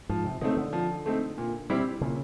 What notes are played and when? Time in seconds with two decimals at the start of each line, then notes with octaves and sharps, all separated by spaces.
0.09 G#2 F3
0.25 C3
0.41 C#3 A3 C4 D#4
0.57 D3
0.73 F3
1.06 A3 C4 D#4
1.38 A#2
1.70 G3 C4 E4 G4
2.01 A#2 C#3